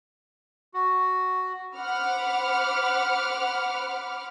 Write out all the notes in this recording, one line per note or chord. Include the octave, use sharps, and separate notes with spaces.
F#4
C5 F#5 B5 D6 F6